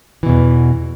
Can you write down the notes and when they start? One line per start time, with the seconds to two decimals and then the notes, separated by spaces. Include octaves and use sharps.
0.23 E3
0.26 B2
0.29 E2